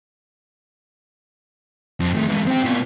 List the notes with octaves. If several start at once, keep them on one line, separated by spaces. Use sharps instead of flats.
F2
A2 D#3
G#2 E3
C4 G4
B2 F4